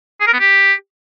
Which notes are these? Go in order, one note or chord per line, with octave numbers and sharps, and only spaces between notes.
G#4
A#4
B3
G4